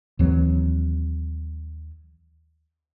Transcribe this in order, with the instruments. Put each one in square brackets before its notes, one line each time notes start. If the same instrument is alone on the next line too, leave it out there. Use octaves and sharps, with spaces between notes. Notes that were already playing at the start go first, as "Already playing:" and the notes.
[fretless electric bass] D#2 E3 F#3 C4